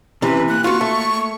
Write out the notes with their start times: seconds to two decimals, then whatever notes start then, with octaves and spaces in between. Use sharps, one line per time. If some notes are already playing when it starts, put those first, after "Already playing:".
0.22 C3 E3 C#4 B4
0.49 A#3 F#6
0.64 F4 F#4 C#6
0.81 A3